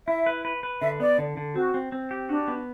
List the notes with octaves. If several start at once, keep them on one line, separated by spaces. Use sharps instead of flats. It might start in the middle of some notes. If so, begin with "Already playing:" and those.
E4 E5
B4
B4
B4
D3 E5
B3 D5
D3
D3
C4 F#4
C4
C4
G4
D4 F#4
B3